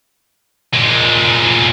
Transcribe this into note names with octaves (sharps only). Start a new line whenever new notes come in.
A#2 G#3